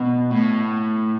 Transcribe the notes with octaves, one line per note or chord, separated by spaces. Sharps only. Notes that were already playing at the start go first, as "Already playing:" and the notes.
Already playing: B2
A2